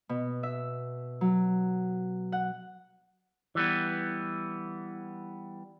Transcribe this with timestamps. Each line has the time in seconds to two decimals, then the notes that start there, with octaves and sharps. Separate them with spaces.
0.09 B2
0.43 E5
1.21 F#3
2.32 F#5
3.55 E3 G3 B3